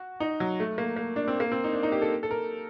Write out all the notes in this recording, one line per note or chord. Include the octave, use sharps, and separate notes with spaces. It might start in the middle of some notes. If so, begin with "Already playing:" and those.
Already playing: F#4
D#4
F#3
A3
A#3
A#3
D4
C4
A#3
C4
D#4
D4
D#4
G4
A4
A4
A#4